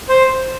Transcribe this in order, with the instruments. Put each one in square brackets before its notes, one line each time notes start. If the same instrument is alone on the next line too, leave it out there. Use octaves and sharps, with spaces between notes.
[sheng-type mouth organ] C5